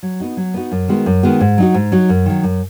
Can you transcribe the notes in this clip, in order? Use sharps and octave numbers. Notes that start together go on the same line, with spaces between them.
F#3
B3 D#4 F#4
F#3
B3 D#4 F#4
F#2
D#3 G#3 B3 F#4
F#2
D#3 G#3 B3 F#4
G#2
F#3 D#4 F#4
G#2
F#3 D#4 F#4
F#2
D#3 F#3
F#2